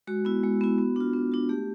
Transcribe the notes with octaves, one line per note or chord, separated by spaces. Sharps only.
G#3 F#4
B3 E4
G#3
B3 E4
B3
D4 F4
B3
D4 F4
A3 G4